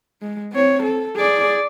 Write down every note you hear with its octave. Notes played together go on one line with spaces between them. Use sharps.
G#3
C4 C#5
A4
G#4 D5